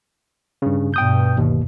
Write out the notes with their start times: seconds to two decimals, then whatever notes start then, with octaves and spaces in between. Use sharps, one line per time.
0.62 G2 C#3
0.94 G2 B2 G5 D#6 G6
1.37 G1 D#2